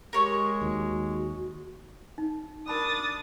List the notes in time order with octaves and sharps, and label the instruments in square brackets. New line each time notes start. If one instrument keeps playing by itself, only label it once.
[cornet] G#3 [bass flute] G4 [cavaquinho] A#4 C#5 C#6
[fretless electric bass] D#2 [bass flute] F#4
[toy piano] D#4
[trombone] D4 [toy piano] A#4 A5 B5 [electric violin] D#6 A6